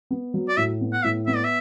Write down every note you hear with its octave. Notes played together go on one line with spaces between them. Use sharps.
B3
F#3
D5
A2 E5
B3
F#5
A2 E5
B3 E5
D5
E5